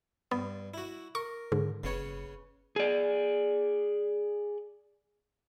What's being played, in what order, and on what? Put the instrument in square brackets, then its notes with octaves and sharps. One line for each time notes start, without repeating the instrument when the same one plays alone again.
[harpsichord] G2 [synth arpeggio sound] B3
[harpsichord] E4 F#4
[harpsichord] A#4 [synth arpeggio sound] C#6
[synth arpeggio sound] G#2 [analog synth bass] D3
[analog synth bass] F#1 [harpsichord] C#3 B3 C#5
[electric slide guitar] G#4 D5